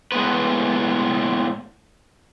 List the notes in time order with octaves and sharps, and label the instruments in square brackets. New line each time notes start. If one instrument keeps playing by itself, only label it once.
[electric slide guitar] A2 G#3 B3 B4